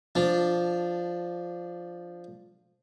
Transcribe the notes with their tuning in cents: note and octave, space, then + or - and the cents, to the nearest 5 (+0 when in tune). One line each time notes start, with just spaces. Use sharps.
F3 +0 D4 +0